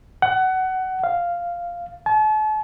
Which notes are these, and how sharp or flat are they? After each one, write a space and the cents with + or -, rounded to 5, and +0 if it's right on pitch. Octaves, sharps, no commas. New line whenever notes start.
F#5 +20
F5 -5
A5 -40